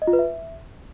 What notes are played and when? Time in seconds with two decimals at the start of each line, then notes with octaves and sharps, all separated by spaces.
0.02 D#5
0.07 F4
0.13 B4
0.19 E5